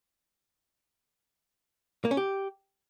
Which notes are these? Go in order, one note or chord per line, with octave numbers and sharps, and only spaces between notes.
A#3
C#4
G4